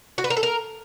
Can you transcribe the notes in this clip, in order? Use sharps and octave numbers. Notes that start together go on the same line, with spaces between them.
F#4
B4
A#4
A4
A#4